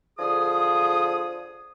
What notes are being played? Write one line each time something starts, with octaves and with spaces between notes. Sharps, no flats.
D3 F3 G#4 D#6